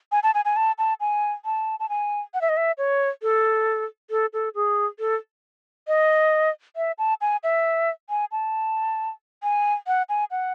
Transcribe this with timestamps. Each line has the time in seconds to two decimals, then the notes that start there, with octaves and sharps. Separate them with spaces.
0.12 G#5
0.23 A5
0.34 G#5
0.45 G#5
0.56 A5
0.78 A5
1.00 G#5
1.45 A5
1.80 A5
1.89 G#5
2.34 F#5
2.41 E5
2.49 D#5
2.57 E5
2.78 C#5
3.22 A4
4.11 A4
4.33 A4
4.55 G#4
4.99 A4
5.88 D#5
6.76 E5
6.98 A5
7.21 G#5
7.43 E5
8.10 G#5
8.32 A5
9.43 G#5
9.87 F#5
10.09 G#5
10.31 F#5